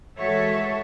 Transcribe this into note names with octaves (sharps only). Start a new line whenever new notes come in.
E3 G#3 F#4 A4 C#5 E5